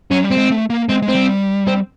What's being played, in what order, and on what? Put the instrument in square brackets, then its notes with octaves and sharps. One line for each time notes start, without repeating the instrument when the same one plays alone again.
[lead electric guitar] F#3 [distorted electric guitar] C#4
[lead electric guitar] G3
[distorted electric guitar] C4
[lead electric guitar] G#3
A3
A#3
[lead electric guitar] G#3 [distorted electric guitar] C4
[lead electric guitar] G#3
[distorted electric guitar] C4
[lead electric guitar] G3
[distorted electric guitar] C4